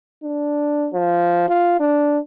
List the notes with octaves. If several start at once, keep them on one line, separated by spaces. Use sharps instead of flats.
D4
F3
F4
D4